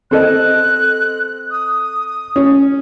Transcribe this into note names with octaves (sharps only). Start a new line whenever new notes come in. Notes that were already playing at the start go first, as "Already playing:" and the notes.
C4 A4 D#5 F#6
D#6
C#4